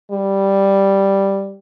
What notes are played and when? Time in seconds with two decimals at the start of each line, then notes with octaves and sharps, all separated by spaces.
0.11 G3